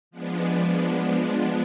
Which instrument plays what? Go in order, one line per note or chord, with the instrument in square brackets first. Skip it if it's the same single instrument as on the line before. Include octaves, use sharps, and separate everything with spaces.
[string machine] F3 G#3 B3 D4